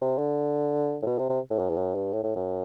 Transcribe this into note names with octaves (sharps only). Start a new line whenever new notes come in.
C3
D3
A2
B2
C3
C3
A2
F#2
E2
F#2
G2
A2
A2
F#2